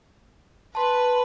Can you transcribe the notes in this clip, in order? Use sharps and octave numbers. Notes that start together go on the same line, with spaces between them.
B4 A5 C6